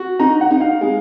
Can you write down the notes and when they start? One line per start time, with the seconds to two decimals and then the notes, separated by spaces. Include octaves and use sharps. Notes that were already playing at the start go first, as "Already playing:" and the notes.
Already playing: F#4
0.19 D#4 A#5
0.41 F#5
0.51 D#4
0.60 F5
0.81 G#3